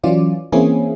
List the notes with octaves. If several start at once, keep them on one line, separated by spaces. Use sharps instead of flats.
E3 F#3 C#4 F4 D5
E3 A#3 C4 C#4 E4 G#4